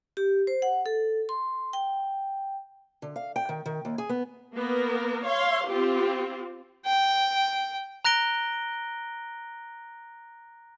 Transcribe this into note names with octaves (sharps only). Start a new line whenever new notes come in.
G4
C5
F#5
A4
C6
G5
D3
F5
G5
D#3
D#3
D#2
G#4
B3
A#3 B3 A#4
C#5 F5 C6
C4 F4 G4
G5
A#5 F#6 A#6 D7 G7